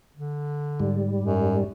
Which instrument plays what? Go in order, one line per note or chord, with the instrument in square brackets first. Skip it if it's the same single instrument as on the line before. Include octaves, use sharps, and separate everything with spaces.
[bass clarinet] D3
[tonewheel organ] G#2 G3
[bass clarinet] F#2